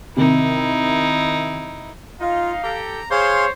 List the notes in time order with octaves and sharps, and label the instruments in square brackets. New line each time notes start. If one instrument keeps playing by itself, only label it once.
[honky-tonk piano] C3 D#3 [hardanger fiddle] D#4 E4
[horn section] D#4 [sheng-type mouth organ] F4 [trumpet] F5
[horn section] G4 A4 [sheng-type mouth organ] A#5
[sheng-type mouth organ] G#4 F5 C6 [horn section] C5 [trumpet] C#5